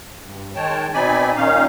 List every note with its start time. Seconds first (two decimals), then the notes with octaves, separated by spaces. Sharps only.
0.24 G2
0.55 D#3 G#3 C#5 G5 A5
0.94 B2 C4 D#4 D5 G#5 B5
1.36 A#2 D#3 C#4 D#4 F5